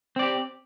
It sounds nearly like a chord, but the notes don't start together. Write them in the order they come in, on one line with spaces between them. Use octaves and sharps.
C4 D5 G4